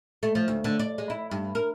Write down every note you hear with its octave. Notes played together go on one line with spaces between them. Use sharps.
A3
F3
D2
D3
D5
G#3
E4
G2
A#4